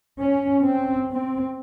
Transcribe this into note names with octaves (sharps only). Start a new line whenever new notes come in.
C#4
C4
C4